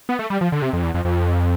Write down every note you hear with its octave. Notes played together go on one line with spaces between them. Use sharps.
B3
A3
G3
F3
D3
C3
F2
E2
F2
F2